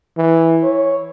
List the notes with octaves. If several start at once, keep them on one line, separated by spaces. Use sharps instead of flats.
E3
C#5